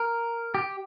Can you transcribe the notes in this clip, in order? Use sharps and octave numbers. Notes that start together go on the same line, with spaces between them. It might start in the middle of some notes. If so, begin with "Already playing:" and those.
Already playing: A#4
G4